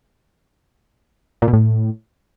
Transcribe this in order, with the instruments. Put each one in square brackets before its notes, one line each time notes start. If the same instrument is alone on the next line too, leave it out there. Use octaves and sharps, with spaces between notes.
[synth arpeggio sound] A#2
B2
A2